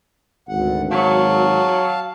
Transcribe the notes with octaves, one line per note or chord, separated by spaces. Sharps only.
G#1 D2 F#5
F#3 F5 A5